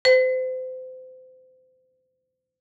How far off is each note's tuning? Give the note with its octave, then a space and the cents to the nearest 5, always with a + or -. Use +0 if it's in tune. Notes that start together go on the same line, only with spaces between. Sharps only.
C5 -30